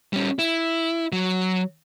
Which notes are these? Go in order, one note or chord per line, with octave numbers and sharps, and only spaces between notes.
G3 C#4
E4
F#3